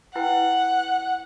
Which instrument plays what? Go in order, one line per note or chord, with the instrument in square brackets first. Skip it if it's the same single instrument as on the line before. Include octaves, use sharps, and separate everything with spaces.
[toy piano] E4 B4 G5 [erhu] F#5